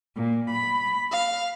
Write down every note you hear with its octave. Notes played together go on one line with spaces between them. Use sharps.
A#2
B5
F5